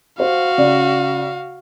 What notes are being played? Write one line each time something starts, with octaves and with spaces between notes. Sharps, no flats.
F#4 C5 F5
C#3 D5